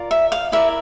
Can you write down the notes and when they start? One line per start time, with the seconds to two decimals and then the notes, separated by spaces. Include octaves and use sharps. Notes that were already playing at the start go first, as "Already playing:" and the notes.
Already playing: F4 A#4 D5
0.11 E5
0.32 F5
0.52 E4 A#4 D5 E5